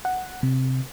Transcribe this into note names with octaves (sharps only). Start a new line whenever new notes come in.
F#5
C3